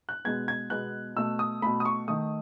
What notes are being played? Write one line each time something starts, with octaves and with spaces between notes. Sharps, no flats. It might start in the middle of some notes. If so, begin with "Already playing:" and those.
F#6
B2 G#3 B3 G#6
G#6
B2 G#3 B3 F#6
B2 A3 E6
D#6
B2 A3 B5
D#6
C#6
D#3 A3 D#6